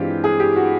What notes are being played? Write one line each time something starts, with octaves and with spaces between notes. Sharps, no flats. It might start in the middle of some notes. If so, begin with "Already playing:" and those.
Already playing: G2 E3 G#3 C4 F4 G4
G#4
G4
F#4